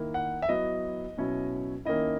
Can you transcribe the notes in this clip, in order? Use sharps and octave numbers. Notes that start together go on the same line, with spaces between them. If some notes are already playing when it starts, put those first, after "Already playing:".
Already playing: D#3 A#3 E4
F#5
E5
F#3 B3 E4 D#5
B2 F#3 C#4 E4
D#3 A#3 C#4 E4 D#5